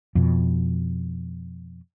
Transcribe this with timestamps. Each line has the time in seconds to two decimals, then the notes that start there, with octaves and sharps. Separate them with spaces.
0.15 F2 B2